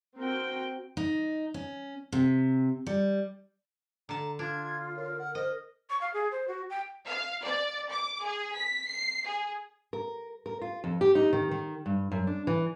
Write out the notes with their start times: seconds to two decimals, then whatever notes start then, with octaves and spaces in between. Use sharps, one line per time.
0.20 C4 F#4 A#4 G5
0.97 D#4
1.54 C#4
2.12 C3
2.87 G3
4.09 D3 A5 A#5
4.39 D4 F4 G#6
4.96 A#4 C#5
5.19 F#5
5.35 C5 D#5
5.90 C#6
6.01 F5
6.14 G#4
6.32 C5
6.48 F#4
6.70 G5
7.07 F5
7.45 D5
7.92 D6
8.26 G#4
8.58 B6
8.89 C7
9.27 G#4
9.93 A#4
10.46 A#4
10.61 F4
10.84 F2
11.01 G4
11.15 D#4
11.33 D#3
11.51 D#3
11.86 G2
12.12 F#2
12.27 D4
12.47 E3